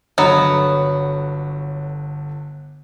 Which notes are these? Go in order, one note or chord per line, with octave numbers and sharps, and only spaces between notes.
G1 D3 F#3 B3